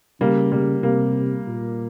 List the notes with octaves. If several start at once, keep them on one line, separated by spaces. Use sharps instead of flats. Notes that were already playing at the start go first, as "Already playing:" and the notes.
C#3 G3 A#3
G3 A#3
C3 G3 A#3
A#2